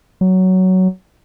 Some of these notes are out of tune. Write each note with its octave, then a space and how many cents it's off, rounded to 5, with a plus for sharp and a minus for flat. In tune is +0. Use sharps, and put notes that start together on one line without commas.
F#3 +10